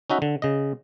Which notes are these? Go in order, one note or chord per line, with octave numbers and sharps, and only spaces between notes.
C#4 D#4 F#4 E5
D3
C#3 D#5